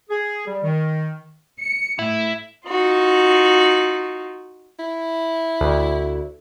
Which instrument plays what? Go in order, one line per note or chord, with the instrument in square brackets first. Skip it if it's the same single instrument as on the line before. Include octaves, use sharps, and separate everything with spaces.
[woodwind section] G#4
G3
D#3
[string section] C#7
[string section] A2 [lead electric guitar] E4
[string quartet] D#4 F4 F#4
[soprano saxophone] E4
[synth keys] D2